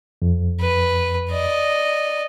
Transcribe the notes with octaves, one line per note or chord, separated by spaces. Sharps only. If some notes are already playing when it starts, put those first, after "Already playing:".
F2
B4
D5 D#5